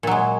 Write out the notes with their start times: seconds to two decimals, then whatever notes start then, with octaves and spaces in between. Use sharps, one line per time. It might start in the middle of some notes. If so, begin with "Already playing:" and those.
0.03 A#2
0.07 F#3
0.11 G#3